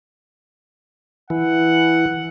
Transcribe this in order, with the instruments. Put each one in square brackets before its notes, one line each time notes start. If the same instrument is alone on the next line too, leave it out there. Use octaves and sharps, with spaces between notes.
[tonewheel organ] E3 [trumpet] F#5